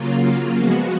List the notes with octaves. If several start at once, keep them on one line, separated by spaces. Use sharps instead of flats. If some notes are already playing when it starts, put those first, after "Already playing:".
Already playing: C#3 F#3 A#3 F4
F3 G#3 B3 F#4